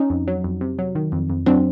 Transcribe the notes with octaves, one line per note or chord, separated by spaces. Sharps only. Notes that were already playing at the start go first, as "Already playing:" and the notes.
Already playing: C#4 D#4
F2
F#3
F2
C3
F#3
D#3
F2
F2
F#3 C4 D4